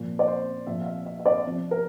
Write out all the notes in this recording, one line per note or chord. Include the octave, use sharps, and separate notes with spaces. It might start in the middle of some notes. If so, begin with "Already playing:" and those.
Already playing: A#2 F3
D5
C5
A#2 F3 E5
F5
E5
E5
E5
D5
C3 F3
A#4